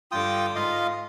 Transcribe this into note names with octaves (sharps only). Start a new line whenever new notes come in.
G2 D3 F4 G5 D6 D#6
G#2 F4 D#5 F5